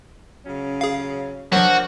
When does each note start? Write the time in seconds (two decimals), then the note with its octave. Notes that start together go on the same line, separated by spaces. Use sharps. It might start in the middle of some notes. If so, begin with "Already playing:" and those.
0.46 C#3 F#3 C#4
0.81 G#4 F5
1.52 F3 F#3 D4 F#4 A#4 C5